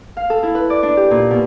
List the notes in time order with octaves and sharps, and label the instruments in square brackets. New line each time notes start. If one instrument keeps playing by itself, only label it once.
[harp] F5
A4
E4
B4
D5
D4
G4
A#2
B2